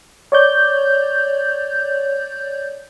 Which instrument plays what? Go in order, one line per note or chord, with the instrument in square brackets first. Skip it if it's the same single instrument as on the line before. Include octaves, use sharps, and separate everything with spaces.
[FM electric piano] C#5 D5 G6